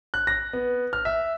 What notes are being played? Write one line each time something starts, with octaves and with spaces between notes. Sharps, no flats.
F#6
A#6
B3
F6
E5